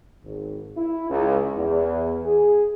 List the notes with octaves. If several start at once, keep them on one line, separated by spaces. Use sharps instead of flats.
G#1
E4
C#2
E2
G#4